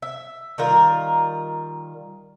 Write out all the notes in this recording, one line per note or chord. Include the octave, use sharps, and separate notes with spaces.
E5
D#3 G3 F4 A#4